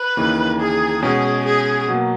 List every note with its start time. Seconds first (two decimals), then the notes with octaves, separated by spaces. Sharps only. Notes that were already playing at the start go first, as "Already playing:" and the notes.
Already playing: B4
0.17 D#2 C#3 E3 A#3 D#4
0.59 G#4
1.02 B2 G#3 C#4 G#4
1.45 G#4
1.88 B2 F#3 A#3